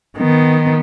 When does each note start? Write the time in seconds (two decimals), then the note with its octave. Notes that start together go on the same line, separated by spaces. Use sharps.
0.17 D#3 B3